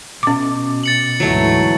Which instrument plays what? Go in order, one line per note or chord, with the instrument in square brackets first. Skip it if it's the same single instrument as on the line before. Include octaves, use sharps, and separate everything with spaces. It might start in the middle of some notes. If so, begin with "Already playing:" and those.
[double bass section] B2 [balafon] C#4 D6
[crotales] A6 C#7 F#7
[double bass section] D2 G#2 E3 [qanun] F#3 A3 E4